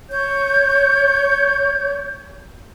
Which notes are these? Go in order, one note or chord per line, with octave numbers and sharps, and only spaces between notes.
C#5 G6